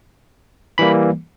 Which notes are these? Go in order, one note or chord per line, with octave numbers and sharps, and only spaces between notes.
E3 G3 A#3 B5